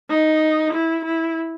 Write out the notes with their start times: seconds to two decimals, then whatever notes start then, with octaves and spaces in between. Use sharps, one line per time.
0.10 D#4
0.73 E4
1.05 E4